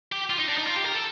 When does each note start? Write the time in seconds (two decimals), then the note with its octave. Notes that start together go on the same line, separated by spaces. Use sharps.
0.12 G4
0.30 F4
0.39 D#4
0.49 D4
0.57 D#4
0.67 F4
0.76 G4
0.86 A#4
0.95 A4